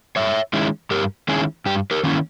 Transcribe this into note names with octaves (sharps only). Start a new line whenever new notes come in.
G2 C#5 E5
D#3 G#3 C#4 E4
G2 G4 A#4
D#3 G#3 C#4 E4 G#4
G2 G4
G4 A#4
D#3 A#3 C#4 E4